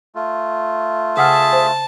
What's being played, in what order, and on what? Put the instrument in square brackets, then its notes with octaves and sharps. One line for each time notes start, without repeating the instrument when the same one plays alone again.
[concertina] A3 F4
[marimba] C#3 F#5 F6 [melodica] G#4 E5 [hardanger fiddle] A5
[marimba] C5